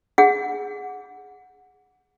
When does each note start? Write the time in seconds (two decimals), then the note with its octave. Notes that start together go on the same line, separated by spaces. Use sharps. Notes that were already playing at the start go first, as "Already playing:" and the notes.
0.18 G#4 F#5